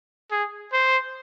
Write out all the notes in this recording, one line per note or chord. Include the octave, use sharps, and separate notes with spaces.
G#4
C5